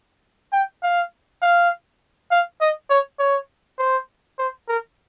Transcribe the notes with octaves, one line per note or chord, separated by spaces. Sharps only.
G5
F5
F5
F5
D#5
C#5
C#5
C5
C5
A#4